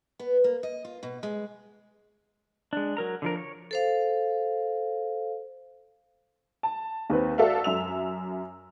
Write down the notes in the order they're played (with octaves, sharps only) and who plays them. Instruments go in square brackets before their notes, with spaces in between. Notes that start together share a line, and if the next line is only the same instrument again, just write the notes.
[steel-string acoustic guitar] B3
A#3
D#5
F4
B2
G#3
[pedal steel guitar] G#3 D4
F#3 A#4 A#5
D3 F3 A#4
C#5
[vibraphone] A4 C5 F5
[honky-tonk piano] A5
D#2 C4 B4
F#4 A4 D5 E5 F5
F#2 E5 E6 F7